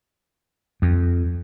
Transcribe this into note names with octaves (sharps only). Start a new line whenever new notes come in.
F2